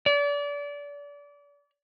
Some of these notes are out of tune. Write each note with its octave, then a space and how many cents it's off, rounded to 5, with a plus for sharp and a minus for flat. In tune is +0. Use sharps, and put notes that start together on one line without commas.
D5 -30